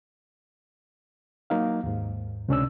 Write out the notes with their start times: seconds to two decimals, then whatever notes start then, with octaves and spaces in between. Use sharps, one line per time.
1.50 F#3 A#3 D#4 F5
1.84 D#2 G#2
2.48 C#2 C3 C#4 D4 D5 E6